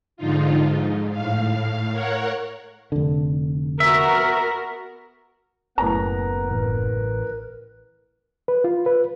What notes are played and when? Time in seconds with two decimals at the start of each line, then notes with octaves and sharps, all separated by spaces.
0.17 G#2 D3 F3 D#4 F4
0.65 G#2
1.11 A2 F5
1.91 A#4 C#5 F#5
2.92 F1 D3
3.80 B3 F#4 A#4 E5
5.78 F#1 A2 B3 A#4 B4 A#5
6.51 A1 A#4 B4
8.48 B4
8.64 F4
8.86 B4